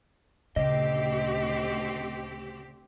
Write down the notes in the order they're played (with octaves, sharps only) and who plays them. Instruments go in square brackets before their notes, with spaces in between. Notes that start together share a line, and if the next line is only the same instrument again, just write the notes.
[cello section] D2 C4 G4 [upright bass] A#2 C#3 [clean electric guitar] D#5